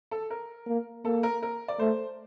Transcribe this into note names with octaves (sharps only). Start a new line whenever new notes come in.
A4
A#4
A#3
A#3 A4
A#4
A#4
D5
A3 C5